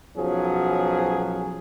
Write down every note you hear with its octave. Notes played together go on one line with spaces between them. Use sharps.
B1 F3 F#3 C#4 G#4